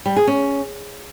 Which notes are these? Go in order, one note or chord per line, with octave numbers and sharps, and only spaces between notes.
G3
G#4
C#4